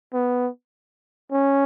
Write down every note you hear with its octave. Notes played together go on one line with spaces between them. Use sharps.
B3
C#4